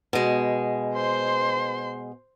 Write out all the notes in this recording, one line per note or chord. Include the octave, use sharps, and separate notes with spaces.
B2 G#3
C5 C6